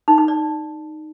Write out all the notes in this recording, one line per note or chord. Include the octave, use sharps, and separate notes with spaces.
D#4
D#4
D5